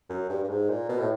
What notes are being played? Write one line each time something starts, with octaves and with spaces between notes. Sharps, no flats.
F#2
G2
G2
G#2
A#2
B2
A2